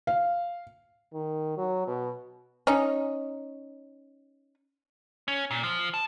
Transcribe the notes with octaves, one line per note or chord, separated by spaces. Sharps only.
F5
D#3
F#3
B2
C#4 D#4
C#4
A#2
F3
A5